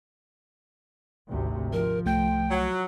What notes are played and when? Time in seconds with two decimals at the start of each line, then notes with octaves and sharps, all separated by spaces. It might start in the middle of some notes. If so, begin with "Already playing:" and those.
1.29 G#1 D2 C3
1.73 F3 A#4
2.06 C2 A3 G5 G6
2.50 F#3